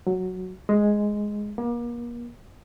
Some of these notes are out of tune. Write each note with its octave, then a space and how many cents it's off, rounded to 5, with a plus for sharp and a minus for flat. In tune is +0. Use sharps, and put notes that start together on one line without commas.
F#3 -5
G#3 +0
A#3 +35